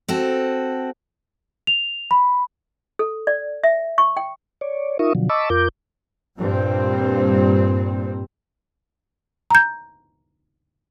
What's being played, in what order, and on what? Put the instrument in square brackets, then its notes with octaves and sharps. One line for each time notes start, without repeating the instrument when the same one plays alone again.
[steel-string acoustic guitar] C4 F#4 A4
[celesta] F7
B5
[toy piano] A4
D5
E5
C#6
G5
[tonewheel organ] C#5 D5
D#4 F4 A#4 E5 C#6 D#6
B2 D3 F3 F#3
D#5 A5 B5 C#6 D6 E6
F2 F4 A#4 D6 G6
[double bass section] G2 A#2 G3 C4
[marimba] A#5 G6